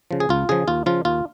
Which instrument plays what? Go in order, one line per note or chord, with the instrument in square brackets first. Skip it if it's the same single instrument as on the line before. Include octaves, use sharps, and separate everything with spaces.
[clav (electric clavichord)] C#3 F3
G#4
C#2 F4
C#3 F3 G#4
D#2 F4
C#3 F3 F4
D#2 F4